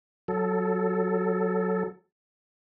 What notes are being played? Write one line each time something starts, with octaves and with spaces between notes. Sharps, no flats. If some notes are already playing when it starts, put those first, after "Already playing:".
F#3 A4